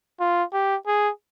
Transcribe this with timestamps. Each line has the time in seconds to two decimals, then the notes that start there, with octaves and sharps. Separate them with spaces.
0.20 F4
0.53 G4
0.87 G#4